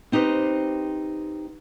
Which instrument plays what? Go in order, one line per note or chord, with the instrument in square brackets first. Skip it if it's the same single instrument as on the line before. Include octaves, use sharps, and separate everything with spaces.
[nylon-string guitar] C4 D#4 G4 B4 C5